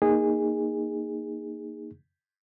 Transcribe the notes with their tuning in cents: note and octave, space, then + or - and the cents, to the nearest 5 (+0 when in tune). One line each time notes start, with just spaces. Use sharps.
A#3 +0 D#4 +0 G#4 -20